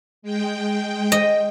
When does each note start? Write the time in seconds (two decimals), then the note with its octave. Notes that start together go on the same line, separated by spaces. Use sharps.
0.22 G#3 G5
1.12 D#5